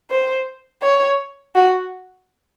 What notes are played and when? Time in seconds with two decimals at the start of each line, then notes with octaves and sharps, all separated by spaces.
0.10 C5
0.82 C#5
1.55 F#4